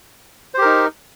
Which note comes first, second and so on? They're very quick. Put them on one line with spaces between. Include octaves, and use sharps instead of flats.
C5 G4 A#4 D#4